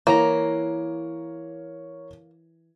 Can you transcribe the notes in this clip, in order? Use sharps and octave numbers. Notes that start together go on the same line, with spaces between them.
E3 A#3 A#4 C#5 A#5